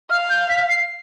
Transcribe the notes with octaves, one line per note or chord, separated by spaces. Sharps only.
F5 F6
G6
B6
C7